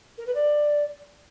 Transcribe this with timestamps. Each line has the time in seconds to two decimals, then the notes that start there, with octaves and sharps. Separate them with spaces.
0.18 A#4
0.26 B4
0.35 D5